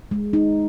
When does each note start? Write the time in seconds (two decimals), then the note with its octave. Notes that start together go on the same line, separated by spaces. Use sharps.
0.11 G#3
0.33 D#4